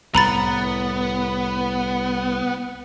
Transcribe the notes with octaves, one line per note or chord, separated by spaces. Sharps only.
C2 A2 B3 A#5 B5 A6